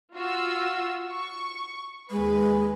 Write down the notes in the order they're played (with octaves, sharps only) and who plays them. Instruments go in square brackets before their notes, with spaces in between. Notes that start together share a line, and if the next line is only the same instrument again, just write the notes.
[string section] F4 F#4 E6
C#6
[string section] D#2 B4 [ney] G#3